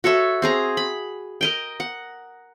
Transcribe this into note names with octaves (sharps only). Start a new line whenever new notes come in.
F#4 A4 C#5 E5
C4 G#4 A#5
B5
A#4 D#5 G5
F#5